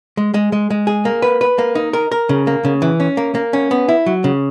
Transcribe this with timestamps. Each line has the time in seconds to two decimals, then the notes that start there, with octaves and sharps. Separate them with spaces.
0.17 G#3
0.34 G#3
0.52 G#3
0.70 G#3
0.87 G#4
1.05 A#3
1.22 B4
1.41 B4
1.58 A#3
1.75 D#4
1.93 A#4
2.12 A#4
2.29 C#3
2.47 A#3
2.65 C#3
2.82 E3
3.00 C#4
3.17 A#3
3.35 A#3
3.53 C#4
3.71 B3
3.88 E4
4.06 F#3
4.24 C#3